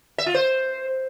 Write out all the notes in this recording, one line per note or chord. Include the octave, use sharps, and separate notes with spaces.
E5
F4
C5